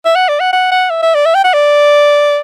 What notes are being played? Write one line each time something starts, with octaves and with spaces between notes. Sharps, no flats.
E5
F#5
D5
F#5
F#5
F#5
E5
E5
D5
E5
G5
F#5
D5